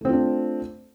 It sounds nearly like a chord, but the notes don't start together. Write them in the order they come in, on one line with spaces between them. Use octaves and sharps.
A3 C4 F4 D4